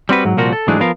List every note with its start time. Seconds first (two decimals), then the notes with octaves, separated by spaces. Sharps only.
0.09 G3 C4 F#4 B4
0.25 G#2 F#3
0.37 C2 A#2 F3 F#4 A#4
0.53 A4
0.68 G#2 E3 F#3 G#3 A3 D4
0.81 F3 B3 A#4 F5